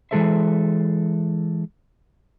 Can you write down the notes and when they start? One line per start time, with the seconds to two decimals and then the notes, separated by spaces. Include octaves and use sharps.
0.11 E3 G#3 G#4 A4 C5 E5